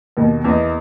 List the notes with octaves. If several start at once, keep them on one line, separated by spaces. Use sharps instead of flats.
D#2 B2
E2 D#5